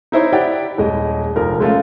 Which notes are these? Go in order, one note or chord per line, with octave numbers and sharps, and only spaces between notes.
D#4 E4 C5 C#5
E4 G4 D5 F#5 G5
D#1 G#3 D#5
F1 F3 A#4
G#3 A3 C#4 F4